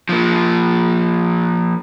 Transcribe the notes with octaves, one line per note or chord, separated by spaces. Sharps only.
F3 A#3